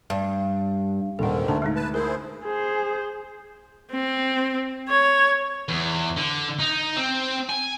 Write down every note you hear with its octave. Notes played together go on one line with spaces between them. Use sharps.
G2
D#1 G#2 D3 D#3 A4 F#5
D2 A5
G#3 A3 D#4
B4 A5
E4 G#4 A#4 C5
G#4 C5
C4
C#5
E2
D3
D#4
C4
G#5